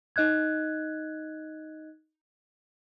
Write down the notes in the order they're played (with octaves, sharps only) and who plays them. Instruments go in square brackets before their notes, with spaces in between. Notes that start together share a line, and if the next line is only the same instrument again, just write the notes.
[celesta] D#4 D#5 F#6 G#6